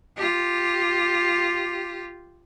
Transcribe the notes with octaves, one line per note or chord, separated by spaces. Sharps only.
F4 G4